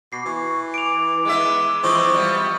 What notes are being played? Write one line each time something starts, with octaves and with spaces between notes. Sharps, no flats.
B2 D6 C7
E3 C#6
D6 D7 F7
G#3 B3 E5
E3 F3 G#3 C4 C#6 D#6
G3 B3 E5